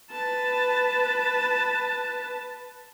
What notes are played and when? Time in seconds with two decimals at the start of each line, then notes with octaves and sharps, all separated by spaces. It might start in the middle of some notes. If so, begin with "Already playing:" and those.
0.11 B4 A5